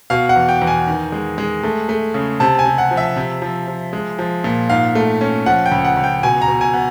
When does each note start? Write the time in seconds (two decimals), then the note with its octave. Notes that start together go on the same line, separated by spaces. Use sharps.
0.10 B2 F5
0.29 F#5
0.36 E2
0.49 G5
0.62 E2
0.67 G#5
0.87 D#3
1.12 G#3
1.38 G#3
1.63 A3
1.89 A3
2.14 C#3
2.40 C3 A5
2.59 G#5
2.66 C3
2.78 F#5
2.91 F3
2.97 E5
3.16 C3
3.42 F3
3.68 F3
3.93 G#3
4.19 F3
4.44 A#2
4.69 G#2 F5
4.95 A3
5.21 C#4
5.46 F3 F#5
5.66 G5
5.72 C#2
5.85 F#5
5.97 C#2
6.04 G5
6.23 B2 G#5
6.42 A#5
6.48 B2
6.61 G#5
6.73 B3